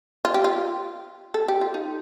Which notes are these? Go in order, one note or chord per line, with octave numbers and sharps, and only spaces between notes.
F4
G4
F4
A4
G4
F4
D#4